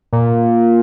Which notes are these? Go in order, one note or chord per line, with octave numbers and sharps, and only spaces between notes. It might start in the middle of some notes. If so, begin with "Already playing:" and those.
A#2